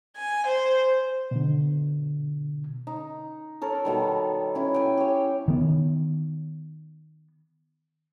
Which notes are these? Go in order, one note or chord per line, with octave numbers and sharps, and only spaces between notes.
G#5
C5
B2 D3
D#4
A4 A#4 C#5
B2 D#3 G3
C#4 E4
G5 G#5
G4 C#5
D#3 B3